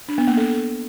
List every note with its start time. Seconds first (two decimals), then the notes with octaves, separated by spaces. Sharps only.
0.08 D4
0.18 B3
0.28 A#3
0.37 A4